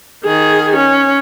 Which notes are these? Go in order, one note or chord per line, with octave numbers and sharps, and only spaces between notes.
D#3 G#4
C#4